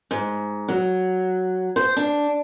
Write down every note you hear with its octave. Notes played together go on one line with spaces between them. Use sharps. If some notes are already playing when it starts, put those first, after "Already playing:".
G#2
F#3
C5
D4